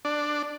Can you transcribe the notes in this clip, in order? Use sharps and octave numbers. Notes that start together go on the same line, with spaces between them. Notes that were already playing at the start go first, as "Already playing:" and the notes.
D4